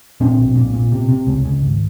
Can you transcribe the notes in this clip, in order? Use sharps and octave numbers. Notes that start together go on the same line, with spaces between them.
A#2 C4 D4
B1
A#2
A#2
C3
C3
C#2
C#2
G#1